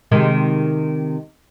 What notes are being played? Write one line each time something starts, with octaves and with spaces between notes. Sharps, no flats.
C3 D#3 G#3